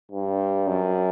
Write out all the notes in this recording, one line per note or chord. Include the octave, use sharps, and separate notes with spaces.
G2
F#2